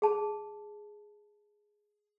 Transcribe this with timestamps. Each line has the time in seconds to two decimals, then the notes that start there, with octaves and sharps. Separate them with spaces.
0.02 G#4 A5